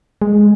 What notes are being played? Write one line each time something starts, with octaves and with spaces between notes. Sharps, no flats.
G#3